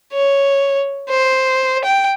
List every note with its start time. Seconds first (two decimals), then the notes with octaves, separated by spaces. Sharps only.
0.13 C#5
1.10 C5
1.84 G5